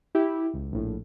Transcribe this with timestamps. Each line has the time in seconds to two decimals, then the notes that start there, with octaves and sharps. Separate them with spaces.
0.15 E4 G4
0.54 C#2
0.72 A#1 A2